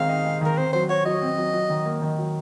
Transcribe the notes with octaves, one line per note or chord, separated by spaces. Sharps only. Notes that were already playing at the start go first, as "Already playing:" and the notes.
Already playing: D#3 G#3 C4 F5
D#4
G#3
D#3 A#4
C4 C5
F#3 C5
F#4 C#5
F#3 D#5
C4
F#3
F#3
D#3
A#3
D#3
F#3